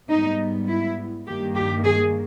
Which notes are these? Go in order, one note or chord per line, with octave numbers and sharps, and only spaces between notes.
G#2 G3 B3 D#4
E4
G2 D#3 A#3 G4
G4
G#4